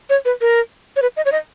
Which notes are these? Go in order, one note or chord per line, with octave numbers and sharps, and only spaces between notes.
C#5
B4
A#4
C#5
B4
D#5
C#5
D#5